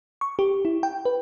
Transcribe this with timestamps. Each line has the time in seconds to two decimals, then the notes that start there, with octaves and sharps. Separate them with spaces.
0.21 C#6
0.39 G4
0.65 E4
0.83 G5
1.05 B4